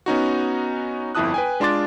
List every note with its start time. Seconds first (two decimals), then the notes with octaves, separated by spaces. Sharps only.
0.06 B3 C#4 D#4 F#4
1.15 G1 F2 E4 A5 D#6 F#6
1.34 B4 G5 G#5
1.60 G#3 D4 F4 C6 D6 A6